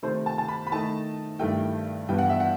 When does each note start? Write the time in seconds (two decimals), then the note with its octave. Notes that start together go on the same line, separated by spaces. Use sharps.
0.03 C3 D#3 A3 C5
0.26 A5
0.38 A5
0.48 B5
0.67 B5
0.72 D#3 A3 D#4 A5
1.39 G2 D#3 A3 E4 G5
2.09 G2 E3 G3 B3 G5
2.18 F#5
2.29 E5
2.40 F#5